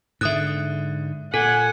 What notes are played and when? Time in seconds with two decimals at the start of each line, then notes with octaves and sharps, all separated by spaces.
0.21 G#2 D3 E5 D#6 F#6
1.34 A#2 A4 F#5 G#5